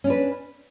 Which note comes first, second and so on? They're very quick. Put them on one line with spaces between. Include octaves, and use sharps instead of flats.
C#4 D4 B4